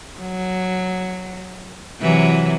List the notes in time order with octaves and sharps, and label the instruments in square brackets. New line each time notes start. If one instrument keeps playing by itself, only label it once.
[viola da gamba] F#3
C3 E3 F#3